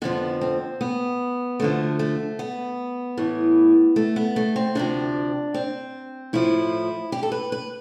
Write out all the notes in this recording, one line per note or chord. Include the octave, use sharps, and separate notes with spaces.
F2 D3 F3 B3
C4
B3
D2 D3 F3 A3
A3
B3
A2 E3
A3
B3
A3
C4
D2 C3 F3 D4
C4
A2 F3 E4
G4
A4
B4
B4